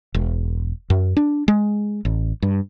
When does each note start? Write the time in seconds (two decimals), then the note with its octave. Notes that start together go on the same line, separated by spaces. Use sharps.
0.14 E1
0.90 F#2
1.17 D4
1.48 G#3
2.05 A1
2.42 G2